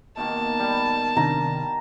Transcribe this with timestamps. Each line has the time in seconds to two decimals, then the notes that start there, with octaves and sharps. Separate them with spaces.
0.17 B2 D#3 A#3 A5
0.59 G3
1.17 C3 D#3 D4 A#5